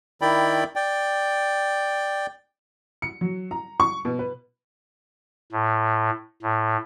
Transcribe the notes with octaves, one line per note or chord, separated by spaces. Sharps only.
D#3 E4 D5 G5 B5
D5 G5
C#7
F#3
A#5
C#6
B2
B4
A2
A2